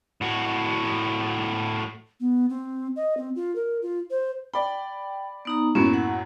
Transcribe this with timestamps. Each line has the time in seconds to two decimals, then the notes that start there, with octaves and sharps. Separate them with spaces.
0.21 A2 F#4
2.20 B3
2.50 C4
2.96 D#5
3.17 C4
3.36 F4
3.56 A#4
3.82 F4
4.11 C5
4.54 D5 G5 B5
5.45 B3 D#4 A#5
5.75 F#2 A2 F#3 A#3 B3 C#4
5.94 F#5